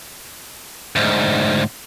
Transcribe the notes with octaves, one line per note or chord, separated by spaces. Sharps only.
D2 G#2